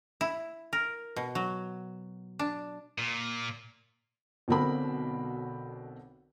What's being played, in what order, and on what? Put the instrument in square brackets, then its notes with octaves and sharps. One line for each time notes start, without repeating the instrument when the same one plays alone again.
[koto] E4
A#4
B2
F#3
D4
[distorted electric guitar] A#2
[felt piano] B1 B2 D3 C4 A#4 B5